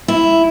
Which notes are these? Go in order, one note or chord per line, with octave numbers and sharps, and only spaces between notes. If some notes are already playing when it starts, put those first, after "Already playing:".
E4